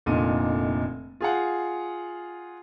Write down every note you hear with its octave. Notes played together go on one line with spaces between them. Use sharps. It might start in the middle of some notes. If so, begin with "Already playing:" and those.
F1 A#2 D3 D#4 D#7
F4 G#4 F5 F#5